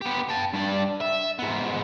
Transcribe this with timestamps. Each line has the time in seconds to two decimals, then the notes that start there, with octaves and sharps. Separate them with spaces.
0.02 B3 G4
0.29 G5 A5
0.54 G2 D5
1.00 E5
1.39 G#2 B3